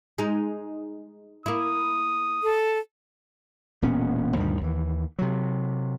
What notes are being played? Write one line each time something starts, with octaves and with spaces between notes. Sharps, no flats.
G#3 D#4
A#3 E4 D#6
A4
E1 A#2 B3 C#4
D2 G2 A#2 D#3
D#2 E3
C3 F#3